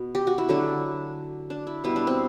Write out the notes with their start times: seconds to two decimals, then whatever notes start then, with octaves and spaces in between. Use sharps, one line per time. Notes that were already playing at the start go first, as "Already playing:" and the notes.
Already playing: B2
0.15 G4
0.27 F#4
0.38 E4
0.48 D3 F#3 A3 D4
1.50 D4
1.67 E4
1.84 B2 G3 B3 E4
1.96 D4
2.07 C4